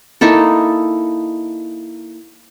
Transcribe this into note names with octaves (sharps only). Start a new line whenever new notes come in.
A#3 D#4 E4 A4